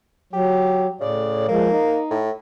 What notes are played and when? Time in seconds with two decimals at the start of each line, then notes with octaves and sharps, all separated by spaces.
0.33 F#3 G4
1.01 A2 C#3 D5
1.48 F3 G#3 A#3
1.70 D#4
2.11 A2